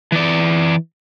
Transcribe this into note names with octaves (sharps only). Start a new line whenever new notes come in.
E3 D5